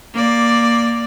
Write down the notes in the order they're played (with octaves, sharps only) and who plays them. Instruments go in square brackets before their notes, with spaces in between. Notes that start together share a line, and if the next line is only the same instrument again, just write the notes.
[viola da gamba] A#3 D5